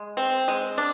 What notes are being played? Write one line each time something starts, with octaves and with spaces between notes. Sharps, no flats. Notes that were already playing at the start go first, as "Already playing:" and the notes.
Already playing: G#3
C4
G#3
D4